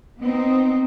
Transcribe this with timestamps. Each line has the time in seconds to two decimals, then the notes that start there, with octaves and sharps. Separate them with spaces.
0.19 B3 C4 D#4